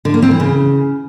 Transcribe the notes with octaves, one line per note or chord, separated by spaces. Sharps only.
D3
A#3
C4
E3
C#3